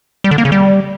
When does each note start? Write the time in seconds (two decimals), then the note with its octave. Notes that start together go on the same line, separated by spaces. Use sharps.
0.24 G3
0.31 D3
0.38 A#3
0.45 C#3
0.52 G3